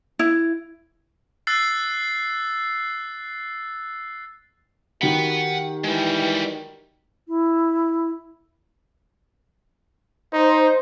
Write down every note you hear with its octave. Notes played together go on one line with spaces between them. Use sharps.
E4
E6 F#6 A6 C7
D#3 F#4 G4 F#5 B5
E3 G3 G#3
E4
D#4 C5